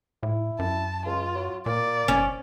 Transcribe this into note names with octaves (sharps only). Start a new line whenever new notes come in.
A2 E4
F#2 A5
C#2 F4
F#3
A#2 A#3 D5
F#1 C#4